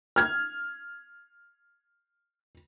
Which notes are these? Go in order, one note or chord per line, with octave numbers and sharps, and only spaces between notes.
F6 G#6